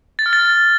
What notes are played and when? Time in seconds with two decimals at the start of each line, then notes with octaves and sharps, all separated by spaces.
0.19 A6
0.26 F6
0.33 A6